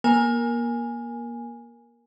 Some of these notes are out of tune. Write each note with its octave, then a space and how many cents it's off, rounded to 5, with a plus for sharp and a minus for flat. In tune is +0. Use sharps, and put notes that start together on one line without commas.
A#3 +30 A#4 +0 G#5 -5